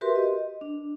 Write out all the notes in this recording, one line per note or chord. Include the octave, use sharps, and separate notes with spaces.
F#4 G4 A#4 B4 E5 C6
D#5
D4